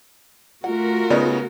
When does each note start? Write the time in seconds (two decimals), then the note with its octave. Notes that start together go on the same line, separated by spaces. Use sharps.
0.64 A3 F4 F#4 A#4 F#5
1.10 C#3 B3 D#4 D5